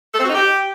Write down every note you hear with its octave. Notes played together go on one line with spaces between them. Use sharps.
A4
C4
F#4
D#4
G4